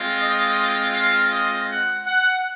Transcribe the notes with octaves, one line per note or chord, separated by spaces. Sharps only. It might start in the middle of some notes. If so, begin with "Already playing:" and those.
Already playing: G#3 C4 F4
D#5
F5
D#5
F#5
F#5